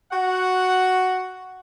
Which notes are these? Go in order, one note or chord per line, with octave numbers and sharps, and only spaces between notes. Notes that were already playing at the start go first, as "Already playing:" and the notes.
F#4 F#5